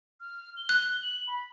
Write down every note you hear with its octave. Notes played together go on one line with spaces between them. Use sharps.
F6
G7
F#6
F#7
B5